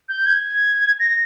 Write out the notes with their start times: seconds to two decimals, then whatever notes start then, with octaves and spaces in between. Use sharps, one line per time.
0.09 G6
0.26 G#6
1.00 A#6